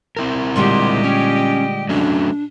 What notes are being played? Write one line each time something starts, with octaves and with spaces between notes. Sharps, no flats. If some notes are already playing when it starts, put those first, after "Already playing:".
C4 E4 A#4
A#2 D3 G3 G#3 G4 D#5 C6
C#4 G5
F#3 A3 C#4 D4